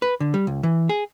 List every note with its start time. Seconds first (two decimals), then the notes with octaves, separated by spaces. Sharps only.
0.02 B4
0.20 D3
0.34 G3
0.47 C#2
0.63 E3
0.89 G#4